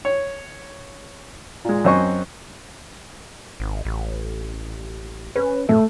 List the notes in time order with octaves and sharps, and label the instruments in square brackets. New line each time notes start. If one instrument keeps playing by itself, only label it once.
[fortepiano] C#5
A#2 G#3
F#2 C4 C5 D#5 G#5 C#6
[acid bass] G#1
A1
[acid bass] C#4 [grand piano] B4
[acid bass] A2 [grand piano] A3